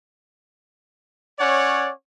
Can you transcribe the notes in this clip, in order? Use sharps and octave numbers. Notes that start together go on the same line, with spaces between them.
C#4 C#5 D5 F#5